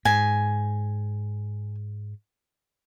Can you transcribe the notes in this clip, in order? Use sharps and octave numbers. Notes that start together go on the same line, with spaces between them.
G#2 G#5